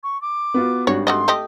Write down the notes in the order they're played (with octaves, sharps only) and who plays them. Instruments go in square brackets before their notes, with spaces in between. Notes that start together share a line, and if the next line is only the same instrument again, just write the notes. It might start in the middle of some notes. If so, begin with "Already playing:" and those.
[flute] C#6
D6
[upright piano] B3 F4 F#4
[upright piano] G#1 G3 D4 [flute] F#4 [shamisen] C#5
[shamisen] A3 F#4 D#5 [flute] C6
[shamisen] A3 G4 D#5